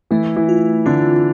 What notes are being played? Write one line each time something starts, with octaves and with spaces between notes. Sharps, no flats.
E3 A3 E4
E3 E4
F4
D3 D4 F4